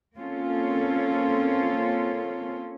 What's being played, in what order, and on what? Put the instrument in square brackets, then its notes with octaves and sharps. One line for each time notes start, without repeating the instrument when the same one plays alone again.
[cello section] A#3 C4 C#4 F4 A4